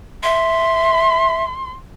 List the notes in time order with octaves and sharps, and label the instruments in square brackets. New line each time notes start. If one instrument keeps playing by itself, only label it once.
[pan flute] E5 [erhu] C6